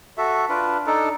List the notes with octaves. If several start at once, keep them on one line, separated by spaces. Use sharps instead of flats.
F#4 A4 E5
D4 F4 B4
D4 D#4 A4